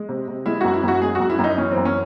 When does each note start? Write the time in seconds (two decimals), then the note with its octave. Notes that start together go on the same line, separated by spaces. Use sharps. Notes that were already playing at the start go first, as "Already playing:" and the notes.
Already playing: G#3
0.09 C3
0.28 C3
0.46 G#3 E4
0.61 F#2 F#4
0.74 E4
0.83 F#2 F#4
1.02 G#3 G#4
1.15 F#2 F#4
1.30 E4
1.39 F#2
1.44 D#4
1.58 E3 C#4
1.72 C4
1.76 F#2
1.85 C#4